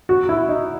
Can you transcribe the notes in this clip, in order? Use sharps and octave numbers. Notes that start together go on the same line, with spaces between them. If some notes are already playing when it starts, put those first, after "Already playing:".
F#4
E4
D#4